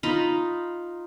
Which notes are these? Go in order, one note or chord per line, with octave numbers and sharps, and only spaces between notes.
D#4 F4 A#5 B5